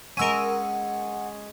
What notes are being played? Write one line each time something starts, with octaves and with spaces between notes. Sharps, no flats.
G#3 C#4 A#4 F#5 E6 D#7